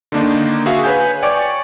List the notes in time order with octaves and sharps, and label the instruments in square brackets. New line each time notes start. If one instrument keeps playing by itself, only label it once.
[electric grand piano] D3 D#3 A#3 D4 D#4
F#4 G#4 E5 F5
B4 C#5 G#5 G6
C#5 D5 G5 G#5 C#6 D6